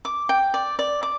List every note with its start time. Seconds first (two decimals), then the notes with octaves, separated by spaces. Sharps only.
0.05 D6
0.29 G5
0.54 D5
0.79 D5
1.03 D6